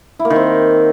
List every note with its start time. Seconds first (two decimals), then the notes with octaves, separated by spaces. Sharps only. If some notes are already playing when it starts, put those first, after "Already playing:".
0.19 E4
0.25 A#3
0.30 D#3
0.36 C4